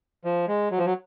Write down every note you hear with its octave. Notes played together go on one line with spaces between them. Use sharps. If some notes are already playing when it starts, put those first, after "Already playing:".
F3
G#3
F#3
F3
F#3